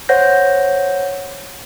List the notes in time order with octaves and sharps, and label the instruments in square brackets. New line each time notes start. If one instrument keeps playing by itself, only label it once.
[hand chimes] C5 C#5 F#5 G6 A#6